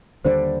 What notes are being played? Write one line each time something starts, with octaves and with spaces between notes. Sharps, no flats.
D#2 D3 G3 D4 C5